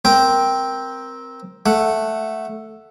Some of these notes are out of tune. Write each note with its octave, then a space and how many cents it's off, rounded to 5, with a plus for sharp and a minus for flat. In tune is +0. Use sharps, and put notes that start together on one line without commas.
C4 +0 A#4 +15 G5 +0
A3 +0 F#5 -5